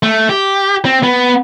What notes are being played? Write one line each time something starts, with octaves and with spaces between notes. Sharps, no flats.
A3
G4
C4
B3